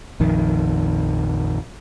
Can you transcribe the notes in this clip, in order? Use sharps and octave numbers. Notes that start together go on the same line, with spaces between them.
A#1 F2 D#3